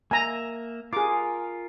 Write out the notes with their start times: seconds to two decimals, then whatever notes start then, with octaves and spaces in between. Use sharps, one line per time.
0.11 A#3 E5 G#5 A#5
0.93 F4 G#4 A#4 D6